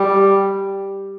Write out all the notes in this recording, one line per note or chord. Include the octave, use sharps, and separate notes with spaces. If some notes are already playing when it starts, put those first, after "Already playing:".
Already playing: G3